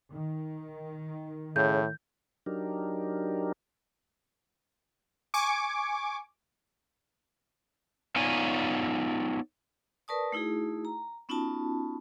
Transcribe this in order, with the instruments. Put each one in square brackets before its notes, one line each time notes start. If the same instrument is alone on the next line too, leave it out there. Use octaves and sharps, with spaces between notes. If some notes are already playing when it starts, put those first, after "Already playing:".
[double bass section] D#3
[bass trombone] A2 [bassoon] C#3 [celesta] G6
[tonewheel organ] F#3 D4 D#4 G4 A#4
[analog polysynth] G#5 C#6 D6
[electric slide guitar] B3 D#4 F4 C#5 D5 G#5
[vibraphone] A#4 B4 D5 A5 C#6 D#6
A3 D#4 E4 F#4 G#4
A#5
B3 C#4 D#4 F4 F#4 A5